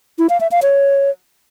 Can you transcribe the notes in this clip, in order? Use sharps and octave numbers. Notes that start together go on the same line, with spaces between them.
E4
F5
E5
F5
C#5